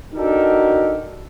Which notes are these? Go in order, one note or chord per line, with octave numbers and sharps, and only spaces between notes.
D4 D#4 F#4 G4 A4 A#4